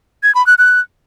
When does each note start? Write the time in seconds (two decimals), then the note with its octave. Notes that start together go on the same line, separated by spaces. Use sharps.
0.23 G#6
0.35 B5
0.47 F#6
0.58 F#6